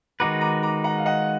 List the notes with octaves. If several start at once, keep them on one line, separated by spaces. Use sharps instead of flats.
D#3 G#3 D#4 F#4 B4 A#5 D6
A#5 D6
A#5 D6
F#5 A#5
F5
D#5 F#5